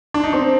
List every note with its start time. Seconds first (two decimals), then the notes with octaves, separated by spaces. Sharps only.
0.14 D4
0.24 D#4
0.33 C4 D4